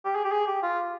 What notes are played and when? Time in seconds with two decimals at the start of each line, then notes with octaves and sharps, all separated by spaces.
0.05 G4
0.15 G#4
0.25 G4
0.32 G#4
0.47 G4
0.63 F4